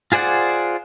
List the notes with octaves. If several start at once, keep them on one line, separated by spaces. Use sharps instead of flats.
F4 G#4 C5 D5 F#5